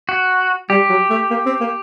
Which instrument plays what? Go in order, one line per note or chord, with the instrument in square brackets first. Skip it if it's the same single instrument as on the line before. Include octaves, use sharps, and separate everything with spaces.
[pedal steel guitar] F#4
[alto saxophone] G3 [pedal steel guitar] G4
[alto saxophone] F#3
A3
A#3
C4
A#3